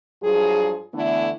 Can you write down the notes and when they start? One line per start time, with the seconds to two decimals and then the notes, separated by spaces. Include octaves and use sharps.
0.22 G2 F3 F#3 G#4
0.93 D3 E3 A3 B3 D4 E4